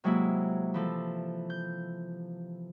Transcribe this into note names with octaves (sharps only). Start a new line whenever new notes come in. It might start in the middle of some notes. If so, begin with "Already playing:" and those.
C3 F#3 G#3 A#3 E4
E3 F3 A4
G6